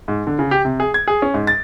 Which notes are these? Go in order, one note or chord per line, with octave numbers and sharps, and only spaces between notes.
G#2
D3
C#3
G4
C3
G#4
G#6
G#4
C#4
G#2
A6